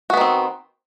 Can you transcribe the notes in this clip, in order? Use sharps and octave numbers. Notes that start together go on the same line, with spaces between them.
D#3 B3 C4 F#4